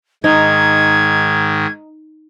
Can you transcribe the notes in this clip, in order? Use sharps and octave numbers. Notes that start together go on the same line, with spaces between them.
G#2 D#3 D#4 G#6